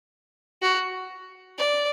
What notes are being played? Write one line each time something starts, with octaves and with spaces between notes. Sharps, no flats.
F#4
D5